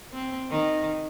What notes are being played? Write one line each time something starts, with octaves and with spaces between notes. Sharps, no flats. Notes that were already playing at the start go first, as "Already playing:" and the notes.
C4
D#3